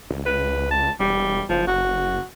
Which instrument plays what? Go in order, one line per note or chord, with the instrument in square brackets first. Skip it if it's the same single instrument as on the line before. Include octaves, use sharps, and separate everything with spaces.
[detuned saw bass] C#2
[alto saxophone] B4
A5
[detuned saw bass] E1 [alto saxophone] G3
[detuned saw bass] F#1 [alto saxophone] F3
[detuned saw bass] F#1 [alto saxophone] F#4